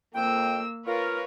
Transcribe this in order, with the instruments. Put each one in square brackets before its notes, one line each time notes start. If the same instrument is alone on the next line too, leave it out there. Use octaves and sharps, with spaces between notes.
[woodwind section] F2 G5 [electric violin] A#3 E6
[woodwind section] F4 A#4 [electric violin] B4 C#5